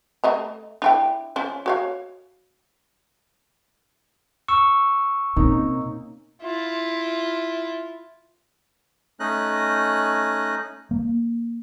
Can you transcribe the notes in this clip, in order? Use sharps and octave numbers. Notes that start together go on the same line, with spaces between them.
A3 D#5 A#5
D4 E4 G5
F3 C#4
F#4 C#5 F5
C#6 E6
C3 A#3 C#4 D#4
E4 F4
A3 C#4 D#4 D#5 F#6
A#3